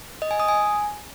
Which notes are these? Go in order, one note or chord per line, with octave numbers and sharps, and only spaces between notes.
D#5
G#5
D#6
G#5